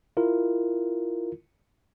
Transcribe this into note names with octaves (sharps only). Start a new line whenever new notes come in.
E4 F4 A#4